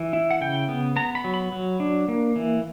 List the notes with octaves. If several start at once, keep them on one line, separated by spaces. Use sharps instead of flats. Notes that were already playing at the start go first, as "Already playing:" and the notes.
Already playing: E3
E4
F#5
C#3 G5
B3
B3 A#5
B5
F#3
B5
F#3
D4
A#3
E3